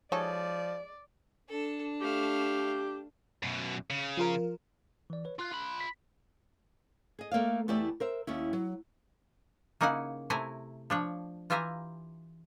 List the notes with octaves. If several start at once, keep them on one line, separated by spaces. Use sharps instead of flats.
F3 G#3 D#4 A4 C#5 D5
D4 A4
A3 G4 F5
F#2 B2
C#3
F3 F4 A#4
E3 D5
B4 C#5
F4 C6 F#6
F4 B5
B6
G#4 D#5
A3 A#3 D5 F5
E2 A3 E4 G4 A4 D5
A#4 C5 E5
D#2 C#4 E4
F#3
C#3 A#3 D#4 E4 F#5 G#5
C3 A3 E4 E5 G#5 A#5
F3 D4 C#5
E3 F4 G4 E5 G#5 A#5